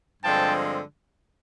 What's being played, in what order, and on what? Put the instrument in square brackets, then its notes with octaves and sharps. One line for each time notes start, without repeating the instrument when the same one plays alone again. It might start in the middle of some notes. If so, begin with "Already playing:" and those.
[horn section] G2 D3 F3 G#3 C4 G5 A5